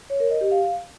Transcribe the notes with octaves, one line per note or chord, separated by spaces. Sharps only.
C#5
A#4
D#5
G4
F5